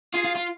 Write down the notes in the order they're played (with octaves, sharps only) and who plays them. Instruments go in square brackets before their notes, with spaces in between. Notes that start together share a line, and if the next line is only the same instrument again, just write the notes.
[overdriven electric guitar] F4 [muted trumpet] G#4
[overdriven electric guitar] F4
F4